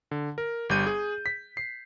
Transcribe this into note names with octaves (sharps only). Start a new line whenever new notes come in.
D3
A#4
G1 G3 G6 D#7
G#4
B6
C7